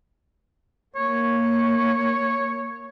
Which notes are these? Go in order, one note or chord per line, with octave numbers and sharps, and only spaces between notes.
A#3 C#5